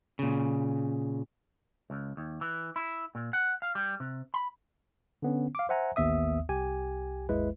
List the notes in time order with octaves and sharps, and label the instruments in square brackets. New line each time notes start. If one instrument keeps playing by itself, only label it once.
[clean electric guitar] A#2 C#3
C#2
D#2
E3
E4
A#2
F#5
F5
G3
C3
B5
[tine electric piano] D3 B3 C#4
F5 D6
C5 E5 F#5 G#5 A#5
A1 D#2 B3 E5 D#6
C2 G4 G#5
G#1 D#2 G#3 E4 B4